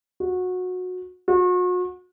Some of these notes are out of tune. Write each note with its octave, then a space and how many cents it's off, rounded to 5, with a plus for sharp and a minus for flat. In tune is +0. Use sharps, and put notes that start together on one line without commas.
F#4 -20
F#4 -40